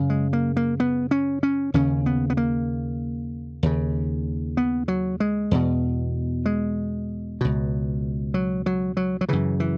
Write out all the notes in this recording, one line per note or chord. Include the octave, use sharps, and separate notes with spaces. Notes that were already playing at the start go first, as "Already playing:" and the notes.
Already playing: F#2 C#3
G#3
A#3
A#3
B3
C#4
C#4
D#2 C#3 C#4
B3
B3
A#3
D#2 C#3
B3
F#3
G#3
E2 B2
G#3
C#2 B2
F#3
F#3
F#3
F#3
F#2 C#3 E3
E3